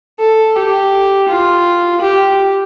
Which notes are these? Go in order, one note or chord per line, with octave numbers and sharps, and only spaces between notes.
A4
G4
F4
G4